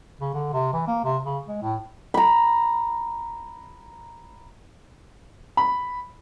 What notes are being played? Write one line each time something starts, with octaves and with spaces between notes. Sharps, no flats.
C#3
D3
C3
E3
A#3
C3
C#3
G#3
A2
A#5 B5
B5